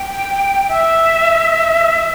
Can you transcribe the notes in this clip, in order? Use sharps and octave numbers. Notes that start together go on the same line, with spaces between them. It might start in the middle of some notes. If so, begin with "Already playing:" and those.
Already playing: G5
E5